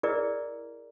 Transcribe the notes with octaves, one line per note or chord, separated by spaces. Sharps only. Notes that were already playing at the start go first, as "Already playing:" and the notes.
E4 G#4 A#4 B4 D5 D#5